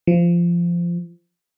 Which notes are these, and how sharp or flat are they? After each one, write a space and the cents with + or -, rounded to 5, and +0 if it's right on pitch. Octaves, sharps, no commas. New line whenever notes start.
F3 -20